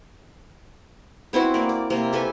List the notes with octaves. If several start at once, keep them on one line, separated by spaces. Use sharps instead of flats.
B3 C4 E4 F#4
A#3 D5
D5
C3 A#3
G4 A4 B4 G#5